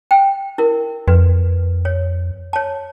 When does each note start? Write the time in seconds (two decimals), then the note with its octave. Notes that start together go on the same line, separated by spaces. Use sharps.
0.11 G5
0.58 E4 A#4
1.08 F2 B4
1.85 C#5
2.53 C#5 A5